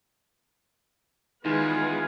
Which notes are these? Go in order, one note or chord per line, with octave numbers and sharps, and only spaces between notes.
E2 D#3 G#3 F4 B4 G#5